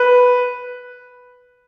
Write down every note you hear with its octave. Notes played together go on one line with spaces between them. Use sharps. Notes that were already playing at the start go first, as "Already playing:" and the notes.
Already playing: B4